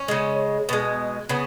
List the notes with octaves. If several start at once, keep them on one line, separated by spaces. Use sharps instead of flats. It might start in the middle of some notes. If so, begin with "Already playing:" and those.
Already playing: C#4
C#3 G#3
B2 G#3
C#3 B3